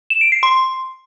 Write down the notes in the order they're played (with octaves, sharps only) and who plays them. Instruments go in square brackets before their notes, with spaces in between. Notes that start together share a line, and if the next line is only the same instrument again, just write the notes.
[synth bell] E7
D7
C7
C6